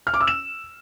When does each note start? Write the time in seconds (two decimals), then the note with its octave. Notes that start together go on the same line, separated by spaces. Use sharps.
0.07 F6
0.14 D6
0.21 E6
0.27 E7